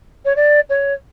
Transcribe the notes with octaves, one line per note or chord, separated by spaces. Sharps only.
C#5
D5
C#5